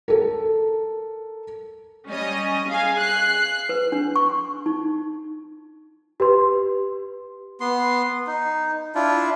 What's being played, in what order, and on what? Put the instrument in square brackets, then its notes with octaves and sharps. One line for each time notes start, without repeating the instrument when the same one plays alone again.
[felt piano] A4 A#4
[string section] G3 C#4 D#5
G#4 F5 G#5
F#6 C7
[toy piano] B4
D4
C#6
D#4
[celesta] G4 B4 C6
[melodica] B3 C6
D#4
D4 E4 F4